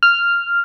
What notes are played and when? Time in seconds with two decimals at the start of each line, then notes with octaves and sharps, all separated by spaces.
0.03 F6